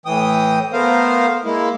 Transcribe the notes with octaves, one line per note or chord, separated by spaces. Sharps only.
A2 E3 G5 D#6
A3 B3 A#4 C5 F5
G#3 A#3 E4